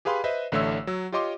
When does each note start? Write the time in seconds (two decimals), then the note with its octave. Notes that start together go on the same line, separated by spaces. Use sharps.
0.05 G4 G#4 B4 F5 B5 C6
0.24 B4 C5 D#5 E5
0.52 A1 D3 A3 C#5 E5 E6
0.87 F#3 E6
1.12 F4 G4 C#5 D#5 C6 D6